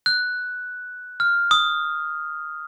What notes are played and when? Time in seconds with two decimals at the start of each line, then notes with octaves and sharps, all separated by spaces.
0.06 F#6
1.20 F6
1.51 D#6